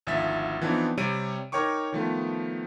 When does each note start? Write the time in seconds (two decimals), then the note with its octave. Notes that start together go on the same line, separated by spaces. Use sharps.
0.07 G#1 D2 F3 E5 A6 B6
0.61 E3 F3 B3 C4 D4 D#4
0.97 C3 G3 C#5 D7 D#7
1.52 D#4 A#4 C#5 G5 C#6 D6
1.92 D#3 F3 A3 B3